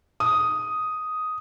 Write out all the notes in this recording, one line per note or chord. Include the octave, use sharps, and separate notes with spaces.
D#6